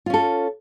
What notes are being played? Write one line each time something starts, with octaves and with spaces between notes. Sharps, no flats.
C#4 F4 A4